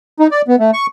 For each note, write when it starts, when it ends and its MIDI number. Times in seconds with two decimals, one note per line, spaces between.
0.19 0.27 63
0.31 0.42 74
0.48 0.56 59
0.59 0.71 57
0.73 0.86 85